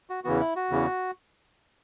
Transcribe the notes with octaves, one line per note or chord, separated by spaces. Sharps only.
F#4
E2 C#3 E3 B3 F#4
E4
F#4
E2 C#3 E3 B3